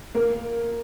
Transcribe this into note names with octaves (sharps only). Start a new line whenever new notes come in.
A#3 A#4